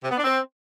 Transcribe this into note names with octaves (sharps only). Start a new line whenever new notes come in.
C3
B3
D4
C4